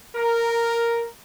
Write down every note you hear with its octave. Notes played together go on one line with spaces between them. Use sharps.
A#4